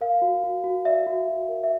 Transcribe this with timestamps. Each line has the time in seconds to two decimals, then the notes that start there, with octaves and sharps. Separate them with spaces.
0.01 A#4 F5
0.22 F#4
0.43 F#4
0.64 F#4
0.85 D5 E5
1.07 F#4
1.28 F#4
1.49 A#4
1.64 E5